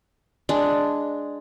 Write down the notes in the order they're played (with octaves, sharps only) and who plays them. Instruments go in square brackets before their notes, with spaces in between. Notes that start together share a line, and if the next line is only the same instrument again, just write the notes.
[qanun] G#3 D4